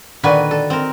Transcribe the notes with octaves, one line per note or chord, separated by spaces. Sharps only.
A#2 D3 D#3 F#4 B4 G#5
A4
C4 A#4